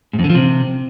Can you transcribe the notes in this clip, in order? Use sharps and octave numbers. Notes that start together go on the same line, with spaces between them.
G#2
F2
D3
F3
C3